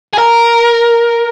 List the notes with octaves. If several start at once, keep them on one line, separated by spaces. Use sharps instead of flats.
G#4
A#4